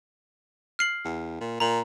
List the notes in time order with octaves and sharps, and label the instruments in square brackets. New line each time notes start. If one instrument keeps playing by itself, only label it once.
[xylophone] F6 C7 F#7
[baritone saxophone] E2
A#2
[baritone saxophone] A#2 [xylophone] A#5 F#7